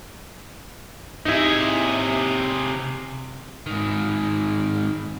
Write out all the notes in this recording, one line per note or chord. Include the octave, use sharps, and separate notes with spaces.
C3 D#4 E4 G#4
G#2 D#3